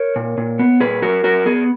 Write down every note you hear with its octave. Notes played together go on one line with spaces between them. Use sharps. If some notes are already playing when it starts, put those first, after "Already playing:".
Already playing: A#4 C#5
A#2
A#2
B3
A#2 G#4 B4
F#3 F#4 A#4
F#3 F#4 A#4
B3 G#4